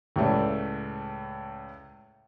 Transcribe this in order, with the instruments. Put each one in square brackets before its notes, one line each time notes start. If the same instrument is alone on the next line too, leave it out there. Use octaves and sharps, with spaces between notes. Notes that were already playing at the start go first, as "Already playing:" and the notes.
[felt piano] C#2 A2 A3 D5